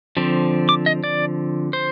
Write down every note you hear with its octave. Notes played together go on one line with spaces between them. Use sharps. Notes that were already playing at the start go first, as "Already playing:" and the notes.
D3 F3 C4
D6
D#5
D5
C5